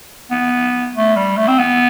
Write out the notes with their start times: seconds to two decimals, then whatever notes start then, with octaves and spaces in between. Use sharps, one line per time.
0.31 B3
0.95 A3
1.16 G3
1.37 A3
1.48 C4
1.59 B3